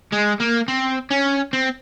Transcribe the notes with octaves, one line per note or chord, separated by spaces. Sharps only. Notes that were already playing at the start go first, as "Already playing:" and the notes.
G#3
A#3
C4
C#4
C4